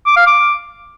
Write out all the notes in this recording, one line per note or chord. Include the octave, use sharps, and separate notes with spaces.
D6
F5
D6